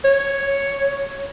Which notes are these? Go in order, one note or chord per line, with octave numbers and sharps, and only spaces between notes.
C#5